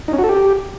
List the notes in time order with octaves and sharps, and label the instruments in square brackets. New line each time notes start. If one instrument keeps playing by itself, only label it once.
[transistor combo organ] D#4
C#4
F#4
A4
G4